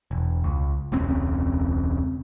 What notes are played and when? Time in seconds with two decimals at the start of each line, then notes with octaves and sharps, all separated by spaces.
0.11 E1
0.44 C#2
0.92 E1 C#2 C#3 C4